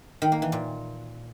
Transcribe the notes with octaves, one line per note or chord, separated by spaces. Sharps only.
D#3
A#3
E3
A#2